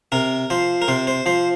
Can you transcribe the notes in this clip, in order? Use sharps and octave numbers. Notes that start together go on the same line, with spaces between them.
C3 A#4
F3 C5
A#4
C3 C5
C5
F3 C5